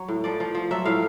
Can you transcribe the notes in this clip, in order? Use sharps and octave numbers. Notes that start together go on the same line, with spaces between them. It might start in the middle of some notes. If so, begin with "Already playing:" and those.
Already playing: F#3 C#5
A2
F3 D5
F3
F3
F#3 E5
A2 F5